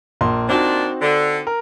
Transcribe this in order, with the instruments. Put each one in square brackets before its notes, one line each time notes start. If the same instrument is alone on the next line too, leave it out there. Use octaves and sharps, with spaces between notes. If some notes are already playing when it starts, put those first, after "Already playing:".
[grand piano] A#1 A#3 C6
[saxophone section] A#2 D4 [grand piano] C4 D#4 F#4
[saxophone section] D3
[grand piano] A#4